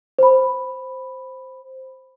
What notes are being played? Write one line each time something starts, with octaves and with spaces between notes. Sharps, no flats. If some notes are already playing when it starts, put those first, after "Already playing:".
C5 B5